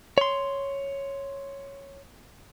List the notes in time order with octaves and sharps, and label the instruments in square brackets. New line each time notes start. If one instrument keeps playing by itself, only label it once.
[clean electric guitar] C#5 C6